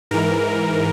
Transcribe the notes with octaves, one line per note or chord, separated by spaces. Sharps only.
G#2 E3 A#4